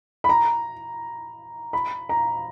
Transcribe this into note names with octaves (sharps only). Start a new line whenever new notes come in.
B5
A#5
B5
A#5